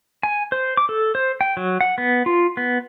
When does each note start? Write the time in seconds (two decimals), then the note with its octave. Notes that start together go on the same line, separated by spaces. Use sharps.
0.23 G#5
0.52 C5
0.77 D6
0.89 A4
1.15 C5
1.41 G5
1.57 F#3
1.81 F#5
1.98 B3
2.26 F4
2.57 B3